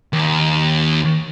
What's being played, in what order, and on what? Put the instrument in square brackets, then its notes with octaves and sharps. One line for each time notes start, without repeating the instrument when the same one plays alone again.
[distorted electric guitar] D#2